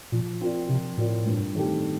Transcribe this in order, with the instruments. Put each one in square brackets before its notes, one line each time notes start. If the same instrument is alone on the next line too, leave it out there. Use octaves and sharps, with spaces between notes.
[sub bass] A#2 [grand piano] F3
[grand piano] C4 F4 A#4 D5
[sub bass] C3 [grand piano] F3
[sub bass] A2 [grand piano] C4 F4 A#4 D5
[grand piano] G2
D#3 A3 C4 G4